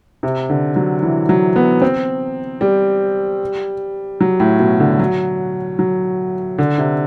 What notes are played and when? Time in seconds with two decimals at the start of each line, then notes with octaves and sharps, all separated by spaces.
0.23 C3
0.50 D3
0.76 F#3
1.02 E3
1.29 F#3
1.56 B3
1.82 C4
2.61 G3
4.21 F#3
4.40 A2
4.60 B2
4.80 D3
4.99 F#3
5.79 F#3
6.58 D3
6.78 C3